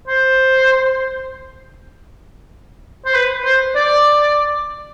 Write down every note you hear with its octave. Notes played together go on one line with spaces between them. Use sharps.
C5
C5
B4
C5
D5